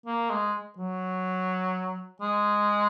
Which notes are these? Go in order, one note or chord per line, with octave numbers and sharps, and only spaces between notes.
A#3
G#3
F#3
G#3